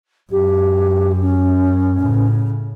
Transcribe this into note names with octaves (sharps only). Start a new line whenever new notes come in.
F#2 G4
C#4
A2 C#3